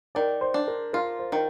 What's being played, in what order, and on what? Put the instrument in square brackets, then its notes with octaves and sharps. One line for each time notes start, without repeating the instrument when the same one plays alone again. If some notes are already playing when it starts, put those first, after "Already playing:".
[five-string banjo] D#3 [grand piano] D5
[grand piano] C5
[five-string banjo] D4
[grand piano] A#4
[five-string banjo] F4 [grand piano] A#4
[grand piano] C5
[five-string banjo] D#3